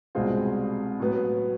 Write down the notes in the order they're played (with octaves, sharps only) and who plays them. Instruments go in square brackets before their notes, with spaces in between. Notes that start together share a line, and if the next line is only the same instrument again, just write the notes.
[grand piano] C2 B2 G#3 C4 F4
A2 F#3 B3